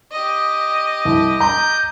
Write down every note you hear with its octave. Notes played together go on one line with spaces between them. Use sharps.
G4 D#5
C2
A#5 G6